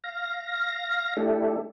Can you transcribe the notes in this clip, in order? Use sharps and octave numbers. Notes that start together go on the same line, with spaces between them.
F5 A#6
A3 D4 E4 G4 A4